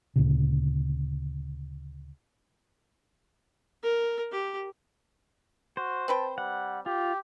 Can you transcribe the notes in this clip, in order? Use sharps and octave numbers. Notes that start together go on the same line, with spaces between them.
D2 A#2 C#3
A#4
G4
F#4 C5
C4 B4 G5 A5
G3 F#5
F4 G4